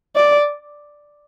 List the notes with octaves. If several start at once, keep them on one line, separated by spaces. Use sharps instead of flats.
D5